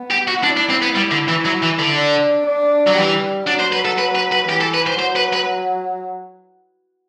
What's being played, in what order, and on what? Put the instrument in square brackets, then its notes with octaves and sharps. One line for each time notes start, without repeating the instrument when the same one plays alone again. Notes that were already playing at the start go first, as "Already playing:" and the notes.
Already playing: [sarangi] B3
[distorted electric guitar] G4
F#4
[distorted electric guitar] D4 [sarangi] E4
[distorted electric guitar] D4
C4
B3
G3
D3
E3
F#3
E3
D3
[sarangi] D4
D4
[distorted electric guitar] F#3
[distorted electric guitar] E3 [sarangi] G3
[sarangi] F#3 [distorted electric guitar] D4
[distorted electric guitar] C5
B4
A4
B4
B4
B4
[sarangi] E3 [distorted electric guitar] G4
[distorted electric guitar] A4
B4
C5
[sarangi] F#3 [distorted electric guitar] C5
[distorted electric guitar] B4
B4